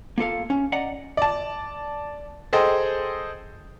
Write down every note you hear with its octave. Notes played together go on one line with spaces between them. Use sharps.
A#3 F4 A4 F5
C#4
D5 D#5 F#5 A#5
D5 A5
G#4 A4 C5 D#5 G5